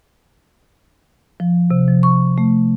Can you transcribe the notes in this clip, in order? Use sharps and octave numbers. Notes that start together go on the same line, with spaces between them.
F3
C3
F3
C#6
A3